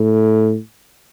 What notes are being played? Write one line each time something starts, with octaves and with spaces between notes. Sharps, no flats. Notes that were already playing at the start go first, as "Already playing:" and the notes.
Already playing: A2